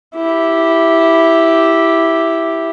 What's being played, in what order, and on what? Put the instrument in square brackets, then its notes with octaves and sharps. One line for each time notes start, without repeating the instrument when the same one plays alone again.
[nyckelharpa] E4 G4